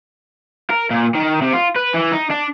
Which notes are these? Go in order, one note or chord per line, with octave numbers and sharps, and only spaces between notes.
A#4
A#2
D#3
C3
F4
B4
E3
D#4
D4